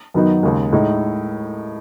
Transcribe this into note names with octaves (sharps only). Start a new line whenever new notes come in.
F#2 D#3 F#3 B3 D#4
D#2 C#3 G#3
A2 G#3 D#4